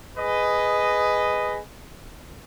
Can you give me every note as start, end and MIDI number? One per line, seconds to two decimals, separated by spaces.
0.17 1.58 68
0.17 1.58 71
0.17 1.58 75